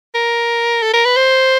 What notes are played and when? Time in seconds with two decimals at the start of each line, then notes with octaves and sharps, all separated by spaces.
0.15 A#4
0.82 A4
0.93 A#4
1.05 B4
1.17 C5